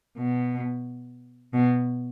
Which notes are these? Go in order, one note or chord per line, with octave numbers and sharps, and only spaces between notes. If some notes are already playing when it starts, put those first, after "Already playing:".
B2
B2